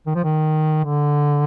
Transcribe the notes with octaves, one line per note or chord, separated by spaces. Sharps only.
D#3
F3
D#3
D3